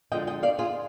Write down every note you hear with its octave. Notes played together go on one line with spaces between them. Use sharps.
D3 F3 G#3 D#5 G5
D#5 G5
D5 F5
F4 G#4